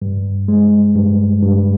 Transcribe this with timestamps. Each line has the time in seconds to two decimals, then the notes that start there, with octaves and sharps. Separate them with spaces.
0.02 G2
0.48 G#3
0.95 G2
1.43 G2